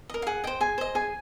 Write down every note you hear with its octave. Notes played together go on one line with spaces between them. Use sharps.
A#4 D#5
F5
G#4 F#5
C5 D#5 G5
G#4 G#5
C5 D#5
G#4 G#5